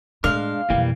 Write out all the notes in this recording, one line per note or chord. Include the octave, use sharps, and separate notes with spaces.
A2 G#3 D4 F5
F2 B2 E3 G3 A#3